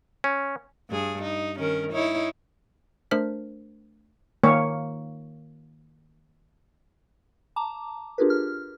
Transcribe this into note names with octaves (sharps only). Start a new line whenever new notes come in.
C#4
G2 G#4
D#4
D#3 C#4 A#4
D#4 E4 C#5
A3 D4 A#4 C5 F6 B6
D#3 A#3 C#5
A5 A#5 D6
D4 F4 G4 G#4 A#4 B4
F6